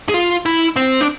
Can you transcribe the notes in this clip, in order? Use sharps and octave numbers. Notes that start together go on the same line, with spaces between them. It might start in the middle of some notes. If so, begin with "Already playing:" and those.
G#4
F4
E4
C4
D4